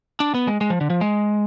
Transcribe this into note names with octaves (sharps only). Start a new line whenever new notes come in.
D4
B3
G#3
G#3
F3
D3
F3
G#3